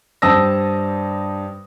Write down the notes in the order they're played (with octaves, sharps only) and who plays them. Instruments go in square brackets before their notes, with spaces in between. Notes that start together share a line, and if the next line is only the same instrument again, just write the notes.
[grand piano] G2 C5 A5 D#6 E6 A#6